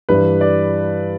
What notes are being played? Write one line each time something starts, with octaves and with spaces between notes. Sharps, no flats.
G2 E3 G3 B4
D5